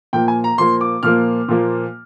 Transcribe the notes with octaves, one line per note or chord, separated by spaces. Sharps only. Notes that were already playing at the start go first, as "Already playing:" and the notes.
A#2 F3 A#3 G5
G#5
A#5
A#2 F3 A#3 C6
D6
A#2 F3 A#3 F6
A#2 F3 A#3